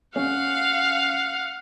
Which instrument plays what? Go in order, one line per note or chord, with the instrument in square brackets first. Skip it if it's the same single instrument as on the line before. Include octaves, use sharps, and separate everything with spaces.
[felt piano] C#4 [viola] F5 F#5